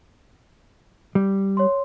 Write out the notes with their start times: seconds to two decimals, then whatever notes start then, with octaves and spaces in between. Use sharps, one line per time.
1.15 G3
1.57 C#5 C6